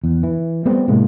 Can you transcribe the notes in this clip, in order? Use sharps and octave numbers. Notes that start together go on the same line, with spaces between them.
E2
E3
G3 A3 B3 C4
A2 C3 G#3 A#3